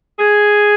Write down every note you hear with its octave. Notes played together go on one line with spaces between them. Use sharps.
G#4